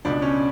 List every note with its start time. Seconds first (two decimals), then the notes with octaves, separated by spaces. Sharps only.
0.05 C#2 B2 D4
0.22 C#4